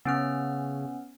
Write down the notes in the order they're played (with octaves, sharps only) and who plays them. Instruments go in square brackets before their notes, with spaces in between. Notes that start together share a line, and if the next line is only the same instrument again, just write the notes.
[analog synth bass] C#3 [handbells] B3 C#4 F6